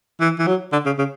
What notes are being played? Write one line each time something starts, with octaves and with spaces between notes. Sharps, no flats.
E3
E3
F#3
D3
C#3
C#3